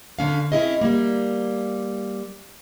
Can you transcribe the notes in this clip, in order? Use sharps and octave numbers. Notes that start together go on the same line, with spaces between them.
D3 C#4 F5
C4 C#4 E4 G#4 D#5
G3 A#3